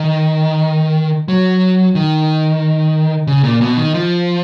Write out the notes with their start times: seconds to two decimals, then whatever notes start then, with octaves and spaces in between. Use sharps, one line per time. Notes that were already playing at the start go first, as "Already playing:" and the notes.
Already playing: D#3
1.28 F#3
1.95 D#3
3.27 C#3
3.43 A#2
3.61 B2
3.77 D#3
3.94 F3